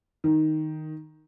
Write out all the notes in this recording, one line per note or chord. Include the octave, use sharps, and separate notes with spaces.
D#3